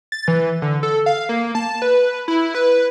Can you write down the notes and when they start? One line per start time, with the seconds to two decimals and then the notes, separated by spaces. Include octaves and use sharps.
0.12 A6
0.28 E3
0.62 D3
0.83 A4
1.06 F5
1.29 A#3
1.55 A5
1.82 B4
2.28 E4
2.55 B4